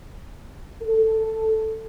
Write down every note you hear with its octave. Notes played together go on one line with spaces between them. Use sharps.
A4